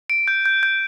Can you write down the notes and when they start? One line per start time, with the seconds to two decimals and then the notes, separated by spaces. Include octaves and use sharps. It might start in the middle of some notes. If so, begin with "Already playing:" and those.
0.10 D7
0.28 G6
0.46 G6
0.63 G6